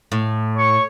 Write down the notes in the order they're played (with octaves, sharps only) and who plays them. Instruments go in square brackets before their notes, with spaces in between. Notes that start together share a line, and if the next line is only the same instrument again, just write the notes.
[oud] A2
[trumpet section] C#5 C#6